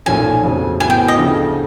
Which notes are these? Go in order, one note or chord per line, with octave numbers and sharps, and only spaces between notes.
B1 A#2 F3 A3 C#4 G#5
F2 C#3 F#3 A3 C4
A2 F#3 B3 E4 G#5
G5
D#5
D2 C#3 F3 A3